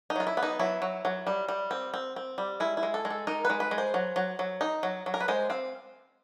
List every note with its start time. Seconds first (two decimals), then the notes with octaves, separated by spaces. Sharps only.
0.10 D#4
0.16 F#3 F4
0.27 E4
0.37 B3
0.43 D#4
0.59 F#3 E4
0.82 F#3
1.05 F#3
1.27 G3
1.49 G3
1.71 C4
1.94 C4
2.16 C4
2.38 G3
2.60 G#3 E4
2.77 E4
2.83 G#3
2.94 A4
3.05 G#3
3.10 A4
3.27 D#4 A#4
3.45 B4
3.50 G#3
3.60 B4
3.71 G#3
3.78 C5
3.94 F#3
4.16 F#3
4.39 F#3
4.61 D#4
4.83 F#3
5.06 F#3
5.14 A#4
5.20 B4
5.28 G#3 C5
5.50 C4 F5